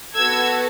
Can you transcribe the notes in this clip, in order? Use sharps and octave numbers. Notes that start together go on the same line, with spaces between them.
B3 F#4 A4 E6 G#6